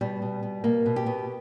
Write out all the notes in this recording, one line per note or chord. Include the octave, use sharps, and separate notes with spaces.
B2 G3
B2
B2
B2 A#3
B2
G4
B2